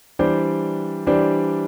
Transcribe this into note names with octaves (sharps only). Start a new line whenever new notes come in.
E3 G3 D4 G4 C5
E3 G3 D4 G4 C5